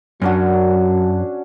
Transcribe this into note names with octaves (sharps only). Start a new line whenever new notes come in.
F#2 F#3 C#4 D4 F#4